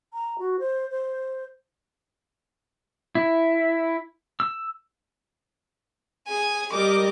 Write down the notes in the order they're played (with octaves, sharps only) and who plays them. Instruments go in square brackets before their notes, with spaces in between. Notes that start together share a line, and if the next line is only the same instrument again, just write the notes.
[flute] A#5
F#4
C5
C5
[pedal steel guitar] E4
E6
[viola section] G#4 [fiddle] G#5
[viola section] G3 A#4 D#5 [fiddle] D6